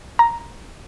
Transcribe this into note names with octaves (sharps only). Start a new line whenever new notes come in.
A#5